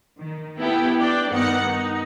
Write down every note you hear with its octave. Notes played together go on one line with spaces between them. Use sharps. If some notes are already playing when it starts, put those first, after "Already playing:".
D#3
B3 E4 G4 A4
D4 D5 G5
G2 D#3 B3 D#4 F#5 C#7
D#4